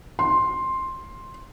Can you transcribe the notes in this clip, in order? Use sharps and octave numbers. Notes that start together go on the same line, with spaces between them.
C6